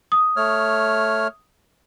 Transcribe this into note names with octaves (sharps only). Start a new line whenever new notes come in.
D#6
A3 C#5 F6